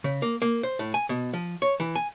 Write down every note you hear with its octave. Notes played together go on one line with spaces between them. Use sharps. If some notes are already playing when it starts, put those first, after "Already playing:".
C#3
A#3
A#3
C5
A2
G#5
B2
F3
C#5
E3
G#5